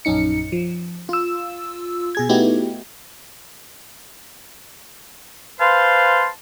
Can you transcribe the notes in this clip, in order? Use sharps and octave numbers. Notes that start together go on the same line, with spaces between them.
A#1 F#2 C#4 D#4 C#7
F3
F4 E6
B2 G#4 G#6
A3 B3 D#4 E4 F#4 G4
B4 C5 F5 A5 C6